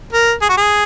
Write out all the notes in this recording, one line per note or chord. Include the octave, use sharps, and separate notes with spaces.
A#4
G#4
F#4
G#4